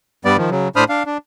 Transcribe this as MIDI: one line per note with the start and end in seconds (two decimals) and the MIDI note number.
0.25 0.37 43
0.25 0.37 55
0.25 0.37 59
0.25 0.37 74
0.38 0.50 51
0.38 0.50 53
0.51 0.68 49
0.51 0.68 54
0.76 0.84 45
0.76 0.84 62
0.76 0.84 72
0.76 0.84 83
0.76 0.84 87
0.76 0.84 89
0.89 1.03 62
0.89 1.03 77
1.06 1.18 62